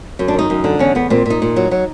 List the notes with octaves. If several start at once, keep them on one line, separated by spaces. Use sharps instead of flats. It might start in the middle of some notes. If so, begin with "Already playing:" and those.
F#2
D4
D#3 D#4
F#2
D3
E2 C#4
E2 B3
A#2 C4
A#2 D#4
A#2
F#3
F#3